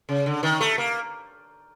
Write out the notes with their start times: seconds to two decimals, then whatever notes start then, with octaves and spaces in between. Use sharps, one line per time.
0.09 C#3
0.26 D3
0.43 D#3
0.61 A3
0.78 A#3